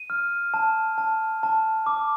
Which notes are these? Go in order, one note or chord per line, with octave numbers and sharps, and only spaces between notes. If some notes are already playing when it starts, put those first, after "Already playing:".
Already playing: D#7
F6
A5
A5
A5
D6